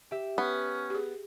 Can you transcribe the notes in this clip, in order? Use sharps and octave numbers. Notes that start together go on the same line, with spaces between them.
G4 E5
B3 C#4
G4 G#4